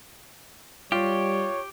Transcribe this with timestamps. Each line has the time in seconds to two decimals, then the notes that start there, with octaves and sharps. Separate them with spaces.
0.92 G3 F4 G4 C#5